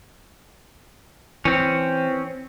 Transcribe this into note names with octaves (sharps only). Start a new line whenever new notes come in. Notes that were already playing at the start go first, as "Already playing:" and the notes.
E3 C4 C#4